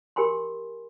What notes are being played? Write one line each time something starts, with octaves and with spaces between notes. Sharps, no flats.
G4 A#4 G#5 B5 C6